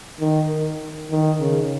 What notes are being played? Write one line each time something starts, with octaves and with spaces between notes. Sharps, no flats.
D#3
D#3
C#3